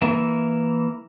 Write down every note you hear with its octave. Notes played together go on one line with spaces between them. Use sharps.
E3 A#3 A#4 E5